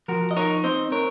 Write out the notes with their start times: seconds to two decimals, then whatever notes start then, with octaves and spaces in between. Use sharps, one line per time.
0.08 F3 F#4 A#4
0.31 D#5
0.37 D#4 A#4 C#5
0.64 C4 C5 D#5
0.92 C4 A#4 C#5